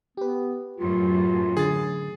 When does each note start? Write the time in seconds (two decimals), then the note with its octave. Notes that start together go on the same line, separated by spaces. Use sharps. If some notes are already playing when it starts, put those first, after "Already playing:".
0.17 B3 G4 B4
0.78 F#2 A2 F#3 F4
1.57 D3 G#4 A6